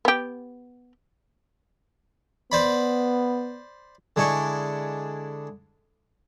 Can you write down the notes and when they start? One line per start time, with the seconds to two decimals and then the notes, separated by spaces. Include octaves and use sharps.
0.05 B3 G4
2.52 B3 C5 D5 B5
4.16 D3 G#3 E4 D5 C#6